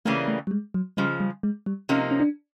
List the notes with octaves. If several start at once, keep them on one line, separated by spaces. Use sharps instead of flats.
C#3 E3 G3 A3 A#3 C#4
A3
G3
G#3
F#3
C#3 F3 G3 G#3
G3
G#3
G3
C3 F3 A#3 C#4 D#4
C#4
D4